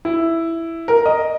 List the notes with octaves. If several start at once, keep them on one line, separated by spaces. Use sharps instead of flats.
E4
A#4
D#5